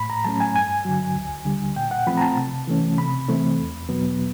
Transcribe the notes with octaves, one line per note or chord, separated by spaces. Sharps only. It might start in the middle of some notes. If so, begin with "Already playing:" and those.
Already playing: A2 B5
A#5
F#3 A3 C#4 A5
G#5
G2 G#5
D3 F#3
D2
D3 G3
A#2 G5
F#5
F3 A3 C4 B5
A#5
A5
C3
E3 A3 C#4
C3 B5
E3 A3 C4
E2
B2 F#3 B3